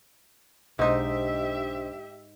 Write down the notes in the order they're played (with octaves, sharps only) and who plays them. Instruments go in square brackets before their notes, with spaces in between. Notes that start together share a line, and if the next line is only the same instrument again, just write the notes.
[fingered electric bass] B1 [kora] G#2 D#4 [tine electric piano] D4 C5 D#5 [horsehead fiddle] G4 E5